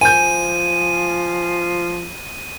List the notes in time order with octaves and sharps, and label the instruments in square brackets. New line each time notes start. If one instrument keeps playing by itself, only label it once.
[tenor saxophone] F3 [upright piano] G#5 G6 [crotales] D#7